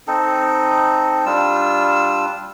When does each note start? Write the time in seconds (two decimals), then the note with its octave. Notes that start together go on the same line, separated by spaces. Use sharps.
0.07 C4 D#4 A4
1.26 G3 D4 F4 E6